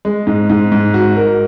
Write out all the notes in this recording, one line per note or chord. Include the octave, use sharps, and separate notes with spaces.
G#3
G#2
G#2
G#2
F#4
A#4